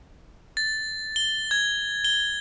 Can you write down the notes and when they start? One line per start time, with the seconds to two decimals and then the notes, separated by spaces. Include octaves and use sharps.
0.57 A6
1.16 G7
1.51 G#6
2.04 G7